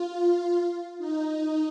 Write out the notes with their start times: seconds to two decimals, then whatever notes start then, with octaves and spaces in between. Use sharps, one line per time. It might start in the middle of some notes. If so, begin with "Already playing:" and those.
Already playing: F4
0.98 D#4